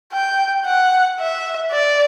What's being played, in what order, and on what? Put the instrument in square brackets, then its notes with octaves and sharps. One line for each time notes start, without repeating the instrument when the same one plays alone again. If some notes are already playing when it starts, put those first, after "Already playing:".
[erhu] G5
F#5
E5
D5